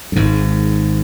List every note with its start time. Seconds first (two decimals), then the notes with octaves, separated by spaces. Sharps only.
0.12 F#2
0.16 G#1 G#2